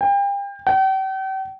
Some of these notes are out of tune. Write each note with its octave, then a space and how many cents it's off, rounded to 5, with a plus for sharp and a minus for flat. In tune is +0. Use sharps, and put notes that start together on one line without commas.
G5 +35
G5 -40